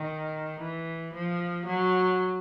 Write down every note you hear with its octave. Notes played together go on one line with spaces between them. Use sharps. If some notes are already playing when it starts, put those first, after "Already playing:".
Already playing: D#3
E3
F3
F#3